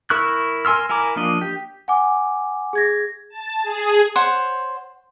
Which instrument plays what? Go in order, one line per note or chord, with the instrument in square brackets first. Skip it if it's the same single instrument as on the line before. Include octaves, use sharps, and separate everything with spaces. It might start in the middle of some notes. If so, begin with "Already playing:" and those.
[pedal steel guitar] E4 A#4 C#6 E6 F#6
A#4 G#5 C6 E6 F6
E4 A#4 G#5 A#5 D6
F3 A#3 D4 D#5
G4
[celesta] F#5 G#5 D6
G#4 G#6 A#6
[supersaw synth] A5
G#4
[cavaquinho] C5 C#5 F#5